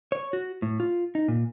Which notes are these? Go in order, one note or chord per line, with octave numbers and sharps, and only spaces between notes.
C#5
F#4
A2
F4
D#4
A#2